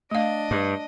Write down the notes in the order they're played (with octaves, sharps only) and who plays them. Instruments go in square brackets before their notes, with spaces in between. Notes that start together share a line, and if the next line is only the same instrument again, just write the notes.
[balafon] A3 F5 [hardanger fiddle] D4 D#5
[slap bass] G2